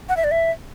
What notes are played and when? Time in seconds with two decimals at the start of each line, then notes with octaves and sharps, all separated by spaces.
0.09 F#5
0.17 E5
0.24 D5
0.31 E5